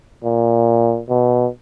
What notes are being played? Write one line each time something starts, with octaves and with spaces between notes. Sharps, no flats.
A#2
B2